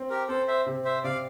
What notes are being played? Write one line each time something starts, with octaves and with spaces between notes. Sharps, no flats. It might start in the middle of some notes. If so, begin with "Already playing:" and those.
Already playing: C4
G4 A#4
C4 A4 C5
C5 E5
C3
C5 E5
C3 D5 F5